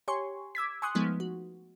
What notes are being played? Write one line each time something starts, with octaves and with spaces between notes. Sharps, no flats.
G4 C#5 G#5 C6 C#6
D6 E6 G#6 B6
G#5 C6 C#6 D#6 F#6
F3 G#3 A3 B3 D#4
F#4